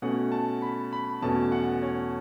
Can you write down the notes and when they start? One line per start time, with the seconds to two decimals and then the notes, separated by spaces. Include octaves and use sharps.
0.02 B2 A3 C#4 F#5
0.32 A5
0.62 B5
0.93 B5
1.22 E2 B2 A3 C#4 A5
1.52 F#5
1.83 C#5